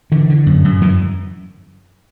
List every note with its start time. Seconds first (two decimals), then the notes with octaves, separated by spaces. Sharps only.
0.12 D3 E3
0.30 D3
0.46 F#2
0.64 F#2
0.81 F#2 E3